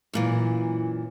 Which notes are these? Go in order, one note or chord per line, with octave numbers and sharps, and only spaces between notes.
F#2 A#2 E3